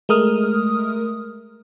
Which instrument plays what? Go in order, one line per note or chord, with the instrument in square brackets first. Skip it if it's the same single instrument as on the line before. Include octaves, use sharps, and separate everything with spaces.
[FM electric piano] G#3 A3 A#4 D#6 F6